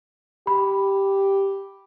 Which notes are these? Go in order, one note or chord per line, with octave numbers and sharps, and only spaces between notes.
G4 B5